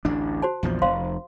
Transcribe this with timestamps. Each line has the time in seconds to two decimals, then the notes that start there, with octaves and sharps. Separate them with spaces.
0.05 A1 D2 D4
0.42 F#4 C5 A5
0.63 A#1 E2 F3
0.82 F1 C5 F5 C6